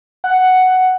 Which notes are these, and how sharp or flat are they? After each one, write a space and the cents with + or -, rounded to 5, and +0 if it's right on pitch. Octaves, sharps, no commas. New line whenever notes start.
F#5 +5